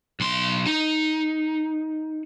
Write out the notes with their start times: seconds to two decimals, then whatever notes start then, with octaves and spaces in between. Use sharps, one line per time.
0.20 B1 C6
0.66 D#4